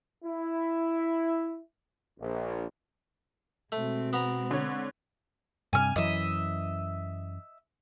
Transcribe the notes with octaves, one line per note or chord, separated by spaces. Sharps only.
E4
A#1
B2 G#3 A3 C4
B3 A#5
D3 C#5
G2 C3 G#5 F6
F#2 E3 D#5 E5